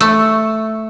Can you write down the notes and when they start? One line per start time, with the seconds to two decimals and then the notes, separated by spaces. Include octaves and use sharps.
0.01 A3 C#6 E6